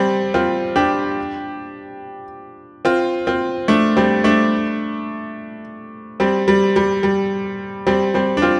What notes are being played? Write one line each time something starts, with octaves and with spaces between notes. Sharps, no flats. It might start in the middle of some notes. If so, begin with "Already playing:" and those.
Already playing: G3 C4
C4 F4
D4 G4
C4 F4
C4 F4
A3 D4
G3 C4
A3 D4
G3 C4
G3
G3
G3
G3 C4
G3 C4
D4
C4 F4